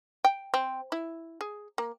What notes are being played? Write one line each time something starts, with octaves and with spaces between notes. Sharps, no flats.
G5
C4
E4
G#4
A#3